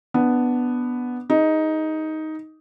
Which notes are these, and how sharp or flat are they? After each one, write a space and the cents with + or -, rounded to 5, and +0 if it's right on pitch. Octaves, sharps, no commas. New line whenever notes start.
B3 +0 D4 +0
D#4 +10 G#4 +0